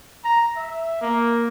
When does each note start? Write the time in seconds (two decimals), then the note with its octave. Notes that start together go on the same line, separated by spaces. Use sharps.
0.24 A#5
0.57 E5
1.00 A#3